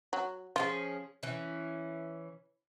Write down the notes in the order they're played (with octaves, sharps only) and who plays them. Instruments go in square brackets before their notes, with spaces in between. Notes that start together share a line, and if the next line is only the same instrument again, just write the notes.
[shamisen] F#3
[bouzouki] F3 C#4 G#4 [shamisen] F4
[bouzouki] E3 C#4